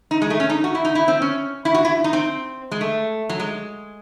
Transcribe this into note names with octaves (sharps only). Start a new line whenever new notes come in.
D#4
G#3
A3
C#4
D#4
F#4
E4
D#4
E4
C4
C#4
E4
F#4
E4
D#4
C4
G#3
A3
F#3
G#3